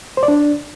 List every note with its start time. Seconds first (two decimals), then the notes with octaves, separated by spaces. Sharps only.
0.17 C5
0.23 D5
0.28 D4